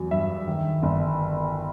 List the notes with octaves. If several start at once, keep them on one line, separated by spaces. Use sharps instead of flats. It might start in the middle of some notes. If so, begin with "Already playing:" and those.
Already playing: E2 F#3
G2 E5
D#3
G1